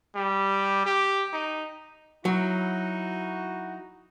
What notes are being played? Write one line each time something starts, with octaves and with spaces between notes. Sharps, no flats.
G3
G4
D#4
F#3 D#4 E4 F#4